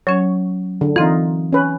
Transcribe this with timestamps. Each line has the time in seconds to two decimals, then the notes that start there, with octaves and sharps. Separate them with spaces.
0.07 F#3 C#4 C#5
0.81 D3
0.96 E3 C4 D#4 F4
1.53 C#4 B4